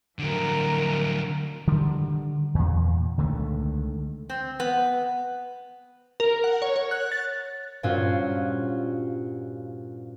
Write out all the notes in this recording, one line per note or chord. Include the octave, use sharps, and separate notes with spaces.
D3 F3 F#3 A#4
D3 D#3 G3
E2 A#2
C#2 D3 D#3 A3
C4
B3
A#4
F#5
C#5
C#5
F#6
A6
G2 A#2 C#4 F4 F#4 C5